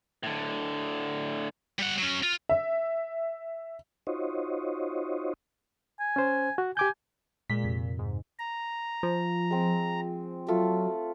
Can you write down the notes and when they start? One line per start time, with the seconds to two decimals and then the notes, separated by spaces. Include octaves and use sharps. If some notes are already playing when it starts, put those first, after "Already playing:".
0.23 A2 D3
1.79 G3 F#5
1.99 F#3 C#4
2.23 F4
2.49 E5
4.07 D#4 F4 F#4 C5 C#5 D#5
6.00 G#5
6.16 C#4 C5
6.58 F#4
6.77 G4 G#5 D6 G6
7.50 A#2 G#3 B6
7.64 F2 C3
7.99 G#2
8.39 A#5
9.03 F3
9.51 G#3 C4
10.48 F#3 A3 F4